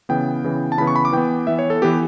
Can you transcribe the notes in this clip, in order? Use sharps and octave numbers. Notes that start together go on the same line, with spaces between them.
C#3 E3 B3 G5
C#3 E3 B3
A5
C#3 E3 B3 B5
C#6
B5
D6
E3 B3 G5
E3 B3 E5
C#5
A4
E3 B3 G4